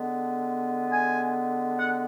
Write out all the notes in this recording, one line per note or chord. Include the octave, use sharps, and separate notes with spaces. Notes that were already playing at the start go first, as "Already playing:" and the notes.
Already playing: D3 G#3 B3
G#5
F#5